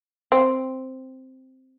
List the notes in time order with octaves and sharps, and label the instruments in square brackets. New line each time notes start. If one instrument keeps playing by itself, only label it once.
[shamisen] C4